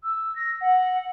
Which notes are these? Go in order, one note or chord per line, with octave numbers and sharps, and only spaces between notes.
E6
A#6
F#5